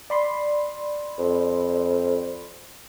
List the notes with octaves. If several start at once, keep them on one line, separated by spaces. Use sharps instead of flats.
D5 B5 C6
F2